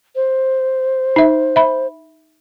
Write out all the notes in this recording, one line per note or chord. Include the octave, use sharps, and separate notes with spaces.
C5
D#4 E5
E5 B5